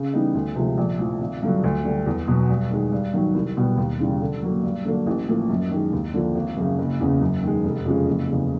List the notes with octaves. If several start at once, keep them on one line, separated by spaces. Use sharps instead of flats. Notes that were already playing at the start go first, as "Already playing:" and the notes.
Already playing: C#3
E3 G3 B3 D#4
D2
C3 F3 G#3
A#1
A2 F3
G#1
G2 D3 F#3
D2
D3 G3
E2
B2 F#3
G2
D#3 G#3
G2
D#3 F#3
C2
B2 G3 B3
D#2
C#3 E3 G3
D3
F#3 A#3
G2
D3 F#3 A#3 D4
A1
A2 F3 A#3
F#2
D#3 G#3
D#2
D3 F3 A#3
G#1
F#2 C#3
F#1
E2 C#3
F#2
D#3 G#3
F1
F2 C#3 F3 G#3
F#1
E2 C#3